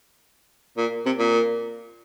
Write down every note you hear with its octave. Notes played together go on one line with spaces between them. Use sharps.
A#2
C3
A#2